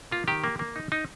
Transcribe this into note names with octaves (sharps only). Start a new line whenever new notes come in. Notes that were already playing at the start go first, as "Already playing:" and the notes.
A#3 F4
D#3 G4
A#3
A#3
D#4
D#4